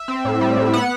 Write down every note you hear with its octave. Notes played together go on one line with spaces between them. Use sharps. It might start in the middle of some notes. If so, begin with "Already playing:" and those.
Already playing: E5
C4
A2
G3
A2
B3 F#5